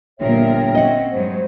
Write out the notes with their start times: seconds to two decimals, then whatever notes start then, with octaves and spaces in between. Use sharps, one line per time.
0.20 G1 A#2 F3 A#4 C#5 E5 G5
0.75 C4 C#4 D#5 F#5
1.11 G2 F#3 G#3 C5